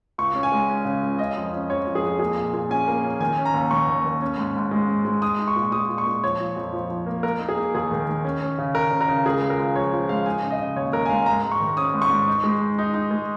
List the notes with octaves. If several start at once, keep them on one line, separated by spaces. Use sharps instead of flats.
C#2 C#6
C#4
G#5
G#3
C#4
C#3
C#2
C#4 D#5
F2
C#4
F2 C#5
F2
G#4
F2
A#3 G#4
A#2
A#2
C#4 G#5
A#3
C#4
D#3 G#5
C#4
A#5
D#2
D#3 C#6
D#2
D#2
C#4
G#2
G#2
G#3
G#2
G#3
D#4 D#6
D#4
C#6
A#2
G#3 D#6
A#2
C#6
A#2
F3 C#5
F3
F2
F3
F3
A#3
A#3 A#4
D#4
G#4
A#3
D#2 G#4
D#3
D#3
C#4
C#4
C#3
C#3 A#4
C#3
A#4
C#3
C#2 G#4
C#2
A#4
C#2
F3 C#5
F3
G#3 F5
D#4 G#5
C#3
D#5
C#3
D#2 C#5
D#2 A#4
G#5
G#3 F5
G#2 A#5
G#2
C#6
D#3
C#4 D#6
G#2
C#6
G#2
D#4
G#3
D#4
D#4
D#4
G#3